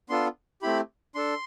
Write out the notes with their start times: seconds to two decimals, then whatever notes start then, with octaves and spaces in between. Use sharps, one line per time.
0.09 B3 D4 F4 A4 C6
0.62 A3 C4 E4 G4 B5
1.15 D4 A4 C6